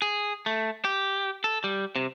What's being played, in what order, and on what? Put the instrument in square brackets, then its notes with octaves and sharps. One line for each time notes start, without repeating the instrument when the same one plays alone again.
[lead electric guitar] G#4
A3
G4
A4
G3
C3